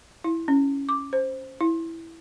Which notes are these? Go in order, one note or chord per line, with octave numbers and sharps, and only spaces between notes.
E4
C#4
D6
C5
E4